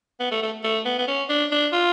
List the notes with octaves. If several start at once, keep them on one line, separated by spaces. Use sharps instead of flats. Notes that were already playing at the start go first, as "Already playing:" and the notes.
B3
A3
A3
A3
B3
B3
C#4
D4
D4
F4